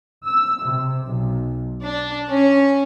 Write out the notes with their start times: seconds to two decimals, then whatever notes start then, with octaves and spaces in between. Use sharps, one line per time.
0.24 E6
0.62 C3
1.05 B1
1.83 D4
2.30 C#4